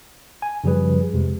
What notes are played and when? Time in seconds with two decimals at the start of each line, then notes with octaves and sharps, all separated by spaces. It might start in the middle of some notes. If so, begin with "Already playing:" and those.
0.42 G#5
0.64 F#2 C#3 F3 G3 G#4 B4
1.13 F2 C3 G#3